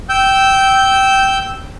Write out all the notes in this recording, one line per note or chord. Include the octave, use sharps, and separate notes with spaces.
G5 E6 G6